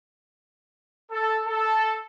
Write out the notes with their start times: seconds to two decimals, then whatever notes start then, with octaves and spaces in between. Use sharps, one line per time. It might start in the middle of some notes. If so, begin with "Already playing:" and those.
1.10 A4
1.46 A4